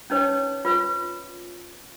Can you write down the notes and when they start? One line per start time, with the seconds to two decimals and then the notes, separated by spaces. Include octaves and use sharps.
0.10 C#4 D#4 B4 C#5
0.65 F4 B4